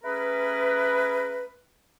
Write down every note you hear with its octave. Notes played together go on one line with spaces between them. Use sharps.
A3 C#4 G#4 A#4 B4